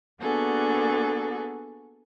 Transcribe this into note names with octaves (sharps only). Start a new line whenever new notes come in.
A#3 B3 D4 F#4 G#4 A4